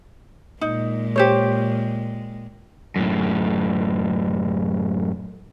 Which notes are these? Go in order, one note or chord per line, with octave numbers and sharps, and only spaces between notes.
A#2 G#3 D#4
G4 C5 C#5
F#2 A2